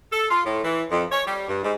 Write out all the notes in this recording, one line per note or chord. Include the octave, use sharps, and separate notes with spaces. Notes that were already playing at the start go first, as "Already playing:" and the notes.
A4
F4
A2
E3
F2
C#5
G3
G2
G#2